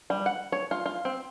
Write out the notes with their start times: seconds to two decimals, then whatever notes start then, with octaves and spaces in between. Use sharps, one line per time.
0.10 G3
0.26 F#5
0.52 C#5
0.71 F4
0.86 F4
1.05 C4